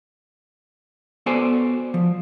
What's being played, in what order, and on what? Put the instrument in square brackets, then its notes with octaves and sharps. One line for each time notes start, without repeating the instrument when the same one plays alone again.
[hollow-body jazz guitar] B3 F#4 A4 C5 D5 G#5
F3